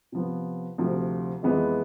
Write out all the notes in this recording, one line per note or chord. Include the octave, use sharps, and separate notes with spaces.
C3 F3 B3
D2 C3 F3
F2 E3 G#3 B3